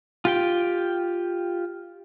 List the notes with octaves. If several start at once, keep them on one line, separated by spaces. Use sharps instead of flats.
F4 G4 G5